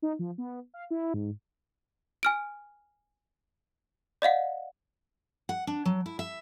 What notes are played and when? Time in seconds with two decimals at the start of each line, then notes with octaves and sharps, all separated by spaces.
0.02 D#4
0.19 F3
0.38 B3
0.74 F5
0.91 E4
1.14 G#2
2.23 G#5 F6 D7
4.22 D5 D#5 F5 F#5
5.49 F#5
5.67 D4
5.86 F#3
6.06 E4
6.19 E5